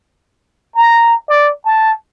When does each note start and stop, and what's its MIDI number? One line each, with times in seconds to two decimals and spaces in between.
0.75 1.17 82
1.28 1.50 74
1.65 1.92 81